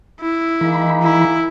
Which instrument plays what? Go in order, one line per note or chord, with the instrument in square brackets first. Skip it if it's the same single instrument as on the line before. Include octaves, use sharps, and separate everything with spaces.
[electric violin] E4
[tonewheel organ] E3 B5 [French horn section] G#3 A#3 D#4
[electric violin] E4